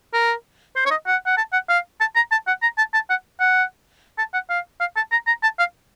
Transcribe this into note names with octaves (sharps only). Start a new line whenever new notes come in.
A#4
C5
C#5
D#5
F#5
F#5
A5
F#5
F5
A5
A#5
A5
F#5
A#5
A5
A5
F#5
F#5
A5
F#5
F5
F5
A5
A#5
A#5
A5
F5